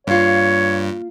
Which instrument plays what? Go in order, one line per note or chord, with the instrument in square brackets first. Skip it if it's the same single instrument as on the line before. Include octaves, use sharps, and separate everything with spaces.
[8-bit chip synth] G2 [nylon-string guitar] A#3 F4 [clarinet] C#5